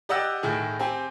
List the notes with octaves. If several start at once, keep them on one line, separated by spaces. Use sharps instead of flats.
G4 D5 D#5 F#5 E6 F#6
A2 D#3 E4 G#4
C4 G4 G#5